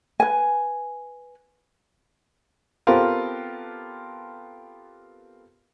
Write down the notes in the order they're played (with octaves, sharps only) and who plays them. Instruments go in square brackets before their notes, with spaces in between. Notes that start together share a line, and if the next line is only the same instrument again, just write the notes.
[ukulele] B4 G#5
[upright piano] B3 C4 F4 G4 A4 A#4